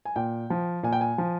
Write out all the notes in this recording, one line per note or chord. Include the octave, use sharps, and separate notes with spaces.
G#5
A#2 G5
F3
A#2 G#5
G5
G#5
F3